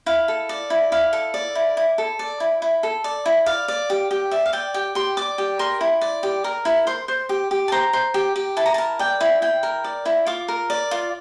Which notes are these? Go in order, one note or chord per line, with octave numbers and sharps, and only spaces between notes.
E4 F5
A4
D5
E4
E4 F5
A4
D5
E4
E4
A4
D5
E4
E4
A4
D5
E4
D5 F5
D5
G4
G4
D5 E5
F5
D5 G5
G4 G5
G4 C6
D5 D6
G4
A#4 C6
E4
D5
G4
A#4
E4
C5 C6
C5
G4
G4
A5
C5 A#5
C5
G4
G4
E4 A5
A#5
A#4 A5
D5 G5
E4
E4 G5
A#4
D5
E4
F4 D6
A#4
D5
F4